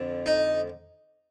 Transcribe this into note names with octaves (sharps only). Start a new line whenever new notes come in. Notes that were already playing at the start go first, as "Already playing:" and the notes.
Already playing: F2 D3
D#4